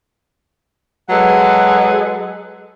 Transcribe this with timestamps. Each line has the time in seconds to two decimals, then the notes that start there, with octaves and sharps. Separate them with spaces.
1.10 F#3 G#3 A4 B4 F#5